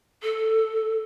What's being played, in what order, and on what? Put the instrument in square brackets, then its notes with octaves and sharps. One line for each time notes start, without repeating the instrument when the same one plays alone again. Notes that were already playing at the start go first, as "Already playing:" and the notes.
[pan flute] A4